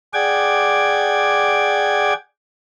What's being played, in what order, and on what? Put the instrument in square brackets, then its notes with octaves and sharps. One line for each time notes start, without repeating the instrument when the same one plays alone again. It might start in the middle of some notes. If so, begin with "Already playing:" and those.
[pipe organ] G#4 D5 F#5 G5 D6 G#6